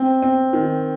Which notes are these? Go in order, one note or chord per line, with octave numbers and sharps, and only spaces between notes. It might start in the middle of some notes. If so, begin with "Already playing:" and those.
Already playing: C4
C4
D#3